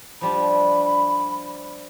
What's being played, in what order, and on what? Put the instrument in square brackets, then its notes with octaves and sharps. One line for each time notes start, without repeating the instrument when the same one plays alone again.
[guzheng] F3 G3 D4 [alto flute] B5